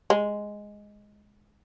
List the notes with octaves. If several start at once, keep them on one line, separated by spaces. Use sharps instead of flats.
G#3